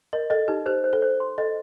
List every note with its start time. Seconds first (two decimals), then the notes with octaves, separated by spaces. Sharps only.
0.13 A#4 D#5
0.30 A4 D#5
0.48 D#4 G4
0.66 G4 C5
0.84 C5
0.93 A4
1.02 C5
1.20 C6
1.38 A4 D#5